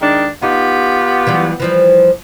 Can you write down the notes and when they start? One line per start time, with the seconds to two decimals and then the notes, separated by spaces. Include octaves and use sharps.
0.01 D#3 G#3 D4
0.42 B3 D#4 F4 G4
1.27 E3 F#3 G3
1.60 E3 F3 G3